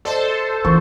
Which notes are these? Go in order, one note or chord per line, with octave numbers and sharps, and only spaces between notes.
A4 C5 D5 D#5 A5
F#1 E3 F3 A#4 C#6